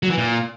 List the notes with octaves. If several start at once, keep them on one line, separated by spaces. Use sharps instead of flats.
F#3
E3
A#2